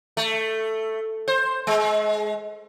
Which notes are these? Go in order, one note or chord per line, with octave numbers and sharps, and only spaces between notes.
A3
C5
G#3